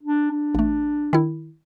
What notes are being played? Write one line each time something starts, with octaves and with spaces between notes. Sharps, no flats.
D4
D4
A1 A3
D#3 E4